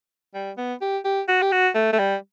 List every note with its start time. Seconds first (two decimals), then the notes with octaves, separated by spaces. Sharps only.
0.34 G3
0.57 B3
0.81 G4
1.05 G4
1.28 F#4
1.42 G4
1.52 F#4
1.75 A3
1.93 A3
1.99 G3